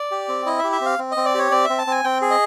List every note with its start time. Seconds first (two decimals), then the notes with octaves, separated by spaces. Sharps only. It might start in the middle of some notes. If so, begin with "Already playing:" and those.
Already playing: D5
0.11 G4
0.28 C4
0.46 E4 D#5
0.59 E5
0.64 G4
0.72 E5
0.81 C4 F5
0.99 C4
1.12 D#5
1.17 C4
1.26 D5
1.34 G4 C#5
1.52 C4 D5
1.65 C4 E5
1.78 A5
1.87 C4 G#5
2.04 C4 G5
2.22 G#4
2.31 D#5